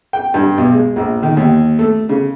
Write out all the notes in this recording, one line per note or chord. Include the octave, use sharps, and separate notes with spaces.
G5
G2
B1
G#3
A#1
D#3
D#2
A3
C#3